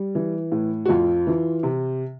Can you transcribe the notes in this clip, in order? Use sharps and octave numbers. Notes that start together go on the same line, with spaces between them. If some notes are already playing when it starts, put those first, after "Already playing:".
Already playing: G3
E3
A2
F#4
F2 F4
E3
C3